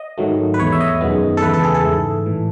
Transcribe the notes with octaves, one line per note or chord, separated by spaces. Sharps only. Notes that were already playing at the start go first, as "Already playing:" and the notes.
Already playing: D#5
G#2 D#3 F#3 A3
B4
E2 B2 A3 C#5
E5
D#5
F#2 D#3 G#3 B3
A4
E2 C#3 E3 A3 B4
A4
G#4
A4
G#2 E3 A3
A2 E3